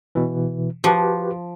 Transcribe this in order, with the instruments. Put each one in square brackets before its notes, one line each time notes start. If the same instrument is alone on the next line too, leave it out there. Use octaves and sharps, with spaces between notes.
[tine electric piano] B2 E3
[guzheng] F3 [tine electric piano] F#4 G4 B4